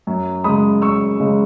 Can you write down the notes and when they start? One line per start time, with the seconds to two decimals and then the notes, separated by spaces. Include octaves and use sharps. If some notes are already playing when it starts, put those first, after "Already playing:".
0.07 F#2
0.44 C#3 G#3 B5 D#6
0.81 F#2 C#6 E6
1.20 C#3 G#3